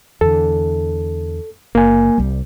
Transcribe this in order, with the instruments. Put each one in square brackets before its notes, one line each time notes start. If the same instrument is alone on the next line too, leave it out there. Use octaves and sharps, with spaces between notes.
[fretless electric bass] E2 D3 [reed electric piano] A4
[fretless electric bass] F#1 [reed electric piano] A#3 G#5
[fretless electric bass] C2 G3